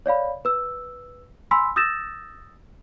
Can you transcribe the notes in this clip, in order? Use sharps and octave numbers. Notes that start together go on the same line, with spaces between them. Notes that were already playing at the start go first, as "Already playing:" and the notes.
C#5 D5 F5 B5
B4 E6
G#5 B5 C6 E6 B6
D#6 E6 G6 A6 A#6 E7